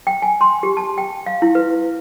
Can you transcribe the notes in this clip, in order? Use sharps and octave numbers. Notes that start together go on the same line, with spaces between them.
G5
G#5
C6
G4
A5
G5
F5
E4
B4